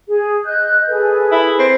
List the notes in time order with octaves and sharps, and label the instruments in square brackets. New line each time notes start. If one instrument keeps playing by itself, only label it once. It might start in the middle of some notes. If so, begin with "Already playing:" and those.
[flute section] G#4
D#5 F#6 G6
G#4 A4 B4
[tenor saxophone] E4
C4